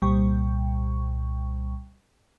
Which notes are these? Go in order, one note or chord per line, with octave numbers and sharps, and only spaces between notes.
C2 A#2 G3 G5 C#6